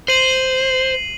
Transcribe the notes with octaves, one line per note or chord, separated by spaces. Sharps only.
C5 C7 D#7 F#7